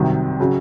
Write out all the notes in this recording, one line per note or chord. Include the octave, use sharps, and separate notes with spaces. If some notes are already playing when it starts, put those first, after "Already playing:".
Already playing: C2 C3 D#3 F#3
C#3 F#3